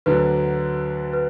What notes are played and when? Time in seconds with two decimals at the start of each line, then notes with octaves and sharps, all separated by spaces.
0.06 D2 D3 F#3 B4
1.13 B4